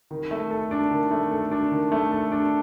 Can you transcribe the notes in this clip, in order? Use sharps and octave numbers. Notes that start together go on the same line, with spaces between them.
D#3
A3
A4
D4
D#3
A3
A4
D4
D#3
A3
A4
D4